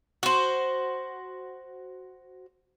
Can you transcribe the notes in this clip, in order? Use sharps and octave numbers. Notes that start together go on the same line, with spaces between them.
F#4 C5